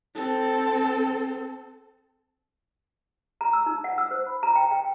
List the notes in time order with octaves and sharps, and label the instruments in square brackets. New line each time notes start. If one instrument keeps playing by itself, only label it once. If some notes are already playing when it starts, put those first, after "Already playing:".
[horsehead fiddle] C4 A4
[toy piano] A#5
E6
D#4
F#5
E6
C5
B5
A#5
G5
G5